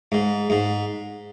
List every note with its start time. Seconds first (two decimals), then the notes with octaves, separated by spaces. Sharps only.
0.12 G#2
0.50 G#2